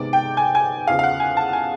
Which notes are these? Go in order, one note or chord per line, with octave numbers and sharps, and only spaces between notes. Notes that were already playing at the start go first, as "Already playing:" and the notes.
Already playing: C3 D#3 G#3 B3 D5
G5
G#5
G#5
E2 C#3 F3 F5
F5
F#5
G#5
A5
G#5